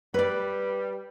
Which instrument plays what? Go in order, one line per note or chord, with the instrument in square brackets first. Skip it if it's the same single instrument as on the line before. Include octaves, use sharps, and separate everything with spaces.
[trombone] G3 [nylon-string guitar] B4 D5